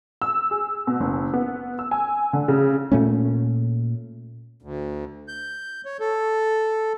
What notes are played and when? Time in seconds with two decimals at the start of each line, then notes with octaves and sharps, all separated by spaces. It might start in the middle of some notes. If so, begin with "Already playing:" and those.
0.22 E6
0.51 G#4
0.87 B2
1.00 F#1
1.34 B3
1.79 E6
1.91 G#5
2.33 D3
2.48 C#3
2.92 A#2 A3 C#4
4.63 D2
5.28 G6
5.85 C#5
6.00 A4